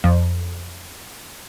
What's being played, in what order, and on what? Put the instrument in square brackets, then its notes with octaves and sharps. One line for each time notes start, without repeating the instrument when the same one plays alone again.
[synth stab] F2